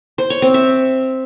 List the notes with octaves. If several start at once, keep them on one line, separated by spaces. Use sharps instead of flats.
C5
C#5
C4
E5